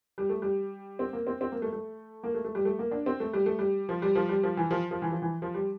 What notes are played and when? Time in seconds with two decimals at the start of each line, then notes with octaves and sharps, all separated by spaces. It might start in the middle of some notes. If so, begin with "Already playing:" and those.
0.18 G3
0.29 A3
0.42 G3
0.99 C4
1.13 A#3
1.27 C4
1.41 C4
1.52 A#3
1.62 A3
1.72 A3
2.23 A#3
2.34 A3
2.44 A3
2.55 G3
2.65 A3
2.79 A#3
2.91 D4
3.06 C4
3.20 A3
3.33 G3
3.46 A3
3.59 G3
3.89 F3
4.02 G3
4.15 F3
4.29 G3
4.43 F3
4.57 E3
4.71 F3
4.91 F3
5.02 E3
5.11 F3
5.22 E3
5.42 F3
5.54 G3